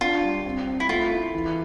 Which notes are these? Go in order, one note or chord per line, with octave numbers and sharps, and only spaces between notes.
D4 F4
G3
C4
C4
E4
A3 F4
E4
E3